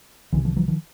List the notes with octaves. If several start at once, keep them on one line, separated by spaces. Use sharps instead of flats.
C2 C3 D3 E3
D#3 F3
E3 F#3
D#3 F3